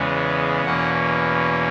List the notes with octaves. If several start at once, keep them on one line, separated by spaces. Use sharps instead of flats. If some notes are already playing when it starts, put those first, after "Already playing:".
Already playing: E2 C#3 G#3 B3
E2 B2 A#3 C#4 F#5